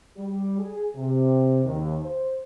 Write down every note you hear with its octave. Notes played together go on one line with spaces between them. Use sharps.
G3
G#4
C3
D#2
C5